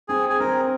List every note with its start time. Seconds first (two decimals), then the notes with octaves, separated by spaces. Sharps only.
0.08 C4 G#4
0.29 G#4
0.40 C4 A#4